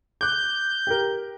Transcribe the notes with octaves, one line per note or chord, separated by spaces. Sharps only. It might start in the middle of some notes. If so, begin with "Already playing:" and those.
D6 F#6 G6
G4 A#4